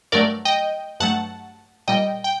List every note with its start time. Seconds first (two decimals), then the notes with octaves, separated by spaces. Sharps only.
0.12 G2 F#3 A3 A#4 D5
0.45 D#5 G5
1.00 G2 F#3 A3 F#5 A5
1.88 A#2 G3 D#5 G5
2.24 G5